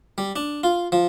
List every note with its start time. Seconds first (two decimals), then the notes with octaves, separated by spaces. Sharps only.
0.18 G3
0.36 D4
0.63 F4
0.92 F3